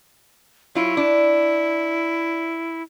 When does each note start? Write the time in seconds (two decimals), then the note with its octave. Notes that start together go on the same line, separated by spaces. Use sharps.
0.75 F#3 E4 F4
0.97 D4